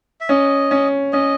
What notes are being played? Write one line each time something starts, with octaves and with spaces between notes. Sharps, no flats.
E5
C#4 D#5
C#4
C#4 D#5